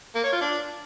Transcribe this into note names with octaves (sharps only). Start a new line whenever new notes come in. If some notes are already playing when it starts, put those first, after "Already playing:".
A#3
C#5
F4
D4